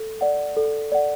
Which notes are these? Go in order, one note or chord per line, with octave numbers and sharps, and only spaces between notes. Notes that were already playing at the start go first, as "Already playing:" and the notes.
Already playing: A4
D5 F#5
A4
D5 F#5